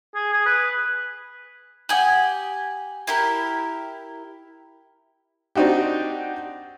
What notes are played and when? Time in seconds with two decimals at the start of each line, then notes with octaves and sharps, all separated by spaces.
0.15 G#4
0.33 G#4
0.46 B4
1.89 G4 F#5 G#5 D#6 F#7
3.07 E4 G4 A#4
5.55 C4 D4 D#4 F#4 G4